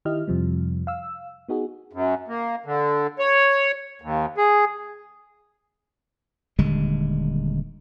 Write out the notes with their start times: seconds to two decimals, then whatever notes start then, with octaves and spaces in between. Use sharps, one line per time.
0.05 D#3 E4 G4 D#5 F6
0.27 F2 C3 F3 G3
0.87 F5 E6
1.48 B3 D#4 F#4 G#4
1.93 F#2
2.28 A#3
2.65 D3
3.19 C#5
4.02 D#2
4.38 G#4
6.59 D#1 D3 G3 G#3